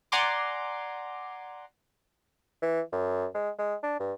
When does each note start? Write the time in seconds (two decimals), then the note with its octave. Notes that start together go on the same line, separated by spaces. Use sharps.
0.12 D5 F#5 G#5 A#5 C6 D6
2.62 E3
2.92 F#2
3.34 G#3
3.59 G#3
3.83 D4
4.00 G2